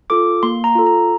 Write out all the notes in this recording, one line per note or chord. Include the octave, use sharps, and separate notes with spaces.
F4 A4 D6
A#3 C6
A#5
F4 A4
A#5